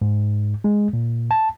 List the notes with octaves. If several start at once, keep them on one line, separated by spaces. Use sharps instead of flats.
G#2
G#3
A#2
A5